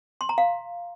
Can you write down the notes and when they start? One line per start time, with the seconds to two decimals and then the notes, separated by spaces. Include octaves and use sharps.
0.21 C6
0.29 A#5
0.38 F5